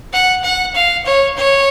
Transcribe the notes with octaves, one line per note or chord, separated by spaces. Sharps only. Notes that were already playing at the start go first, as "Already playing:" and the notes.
F#5
F#5
F5
C#5
C#5